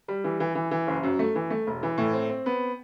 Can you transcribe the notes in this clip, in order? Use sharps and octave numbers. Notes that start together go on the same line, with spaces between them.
G3
E3
E3
E3
E3
F#1
F#2
A3
E3
A3
E1
E3
A2
C4
C4
B3